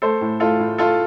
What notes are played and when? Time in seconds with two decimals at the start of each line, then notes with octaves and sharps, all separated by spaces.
0.02 A3 A4 C5
0.21 A2
0.40 A2 F4 A4
0.59 A2
0.78 A3 F4 A4